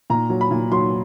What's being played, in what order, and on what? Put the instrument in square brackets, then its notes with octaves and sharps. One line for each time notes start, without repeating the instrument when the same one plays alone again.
[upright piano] A#2 A#5
F#3
B5
A#2
F#3 C6